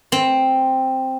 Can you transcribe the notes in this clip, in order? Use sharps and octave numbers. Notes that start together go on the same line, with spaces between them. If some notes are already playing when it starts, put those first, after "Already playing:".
C4